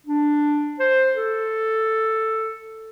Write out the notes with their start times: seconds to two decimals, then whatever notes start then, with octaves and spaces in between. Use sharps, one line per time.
0.07 D4
0.79 C5
1.15 A4